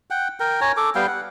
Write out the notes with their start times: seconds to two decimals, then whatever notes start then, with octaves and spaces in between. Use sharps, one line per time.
0.10 F#5 G5
0.40 A#4 G5
0.61 C#5 G#5 A#5
0.77 A4 D6
0.95 G3 B3 F5 G5
1.07 F#5